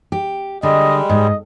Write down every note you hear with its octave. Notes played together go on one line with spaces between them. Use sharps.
G4
D3 G3 G#3 D#5
G#2 D#5